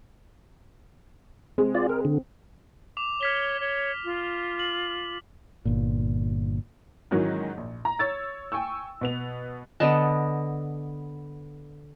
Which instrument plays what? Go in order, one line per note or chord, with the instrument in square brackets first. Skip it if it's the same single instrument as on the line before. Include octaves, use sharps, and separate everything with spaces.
[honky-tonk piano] G#3 [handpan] C4
[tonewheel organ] F4 D5
A#4
D3
[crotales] D6 F7
[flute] C#5 [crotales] F6 B6 G7
[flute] C#5
F4
[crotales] F#7
[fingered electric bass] G1 A#2
[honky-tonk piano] G#2 D#3 E3 F#3 C#4 F#4
A#1
A#5
C#5 E6 A6
G5 G#5 C#6 E6
B2 B3 F7
[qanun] D3 B3 D#5 A5